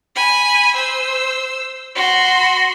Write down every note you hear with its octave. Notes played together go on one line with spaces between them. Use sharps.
G#5 B5
C5 E6
F#4 C6